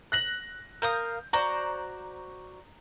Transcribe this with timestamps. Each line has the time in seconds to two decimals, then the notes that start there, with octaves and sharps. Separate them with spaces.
0.12 F#6 A#6 F#7
0.82 A#4 F5 D#6 G6
1.33 F#4 C5 D5 A#5